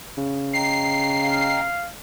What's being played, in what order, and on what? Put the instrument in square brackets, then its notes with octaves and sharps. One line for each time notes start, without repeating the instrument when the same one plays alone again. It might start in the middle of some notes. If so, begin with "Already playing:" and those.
[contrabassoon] C#3
[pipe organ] D#5 G5 A#5 [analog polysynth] C7
[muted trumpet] F5